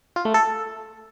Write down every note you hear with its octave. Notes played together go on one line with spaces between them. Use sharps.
F4
A3
A4